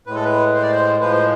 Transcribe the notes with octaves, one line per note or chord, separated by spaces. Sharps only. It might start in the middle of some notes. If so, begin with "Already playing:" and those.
A2 G#3 B4
A4
B4
C5
D5
C5
A2 F3 G#3 B4
C5